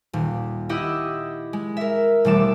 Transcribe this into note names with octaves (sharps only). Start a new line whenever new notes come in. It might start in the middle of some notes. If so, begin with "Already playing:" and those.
D#1
E4 G4 D#5 F#5 E6
G#3
A#4 E5
E1 E3 G3 A3 D6 E7